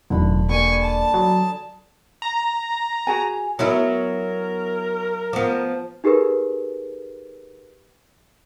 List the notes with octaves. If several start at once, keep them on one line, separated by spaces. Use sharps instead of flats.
E1 F#2 A2 D3 D#3 B5
G3 A#3 G#5 C#6
A5
F#3 G#4 A#5
A#5
F#4 G#4 G#5
F#3 B3 E4 A#4
F3 B3
D#4 G4 G#4 A#4 B4